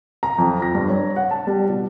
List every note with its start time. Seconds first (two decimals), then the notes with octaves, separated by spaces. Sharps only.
0.23 A#5
0.38 F2
0.62 A#6
0.75 G2
0.89 C#5
1.16 F#5
1.31 A5
1.47 G3
1.69 B2